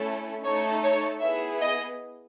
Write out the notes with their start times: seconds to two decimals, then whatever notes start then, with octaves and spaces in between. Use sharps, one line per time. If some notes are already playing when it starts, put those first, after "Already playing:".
Already playing: A3 C#4 E4 A4
0.45 A3 D#4 A4 C#5
0.83 C#5
1.21 B3 E4 G#4 E5
1.60 D#5